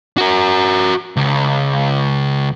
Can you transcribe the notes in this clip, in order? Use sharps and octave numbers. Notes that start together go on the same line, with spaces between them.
F#4 A#4
C#2